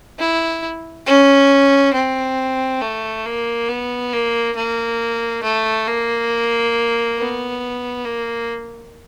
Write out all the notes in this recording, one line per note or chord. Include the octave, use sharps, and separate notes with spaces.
E4
C#4
C4
A3
A#3
B3
A#3
A#3
A3
A#3
B3
A#3